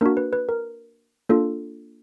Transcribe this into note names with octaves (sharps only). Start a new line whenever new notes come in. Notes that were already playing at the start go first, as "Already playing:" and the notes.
A#3 D4 F#4 A#4
B4
B4
A#4
A#3 D4 F4 A4